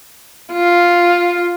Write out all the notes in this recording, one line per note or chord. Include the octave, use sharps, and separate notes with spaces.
F4